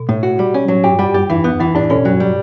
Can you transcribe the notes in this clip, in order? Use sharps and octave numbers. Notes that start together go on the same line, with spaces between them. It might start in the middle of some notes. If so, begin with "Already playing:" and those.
Already playing: B2
A2
F#4
G3
C#4
A2 F#3
G2 G4
F#2 G3
F#2 G4
E2 E3
E2 B3
F#2 E3
A2 D4
B2 C#4
G2 F#3
G3